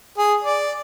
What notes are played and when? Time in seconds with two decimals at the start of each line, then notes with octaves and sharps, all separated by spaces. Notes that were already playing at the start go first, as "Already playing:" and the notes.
0.18 G#4
0.44 D5